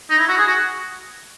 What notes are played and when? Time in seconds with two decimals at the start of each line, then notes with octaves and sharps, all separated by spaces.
0.10 D#4
0.19 E4
0.29 F#4
0.38 G#4
0.47 F#4